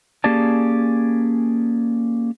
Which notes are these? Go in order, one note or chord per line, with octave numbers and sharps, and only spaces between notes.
A#3 C#4 G4 G#4 D5 A5